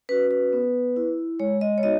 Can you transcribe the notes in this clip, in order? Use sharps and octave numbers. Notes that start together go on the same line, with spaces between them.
C#4 F#4 B4
B4
B3
E4
G#3 C#5
D#5
C#5
B3 D#4 F#4 D#5